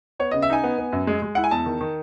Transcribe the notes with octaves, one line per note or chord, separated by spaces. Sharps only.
B3 C#5
C#3 D#5
E5
D#4 G#5
B3
B3
F#2
G#3
G#3
E4 F#5
G#5
E2 A5
D#3
D#3